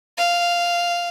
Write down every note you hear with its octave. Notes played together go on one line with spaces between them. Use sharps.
F5